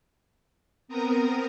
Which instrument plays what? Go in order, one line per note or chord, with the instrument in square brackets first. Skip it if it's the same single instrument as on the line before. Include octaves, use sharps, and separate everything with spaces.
[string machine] B3 C4 A#4 A#5 D#6